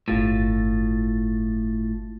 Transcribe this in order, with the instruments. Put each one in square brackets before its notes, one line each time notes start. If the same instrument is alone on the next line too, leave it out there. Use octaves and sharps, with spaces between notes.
[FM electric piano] G1 F4 A6 [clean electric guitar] A2